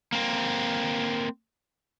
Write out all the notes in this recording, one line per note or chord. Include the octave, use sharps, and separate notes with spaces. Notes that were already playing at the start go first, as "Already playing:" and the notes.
A#3 C4